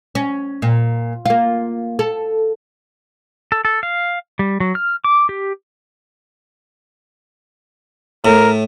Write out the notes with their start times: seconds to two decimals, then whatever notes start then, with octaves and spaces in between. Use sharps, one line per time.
0.15 C#4
0.62 A#2
1.26 A#3 F4
1.99 A4
3.52 A4
3.65 A4
3.83 F5
4.39 G3
4.60 F#3
4.75 F6
5.04 D6
5.29 G4
8.25 A2 A#4